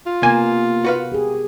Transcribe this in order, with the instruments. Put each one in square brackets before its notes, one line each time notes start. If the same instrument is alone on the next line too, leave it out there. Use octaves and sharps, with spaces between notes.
[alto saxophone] F4
[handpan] C3 B3 A#4 [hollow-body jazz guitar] A#3 [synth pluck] G#5
[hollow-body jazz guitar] F#4 B4 F5
[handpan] G4 G#4